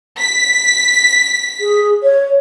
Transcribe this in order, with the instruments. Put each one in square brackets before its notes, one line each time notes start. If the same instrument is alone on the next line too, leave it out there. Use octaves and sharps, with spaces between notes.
[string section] B6
[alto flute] G#4
C#5